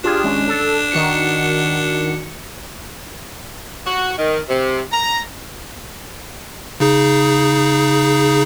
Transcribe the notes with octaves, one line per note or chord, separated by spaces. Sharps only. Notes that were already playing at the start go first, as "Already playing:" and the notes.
D4 F4 G4 G#4
G#1 G#3 C#4
A4
D#3 F#4 C#7
F#4
D#3
C3
A#5
C#3 D#4 G#4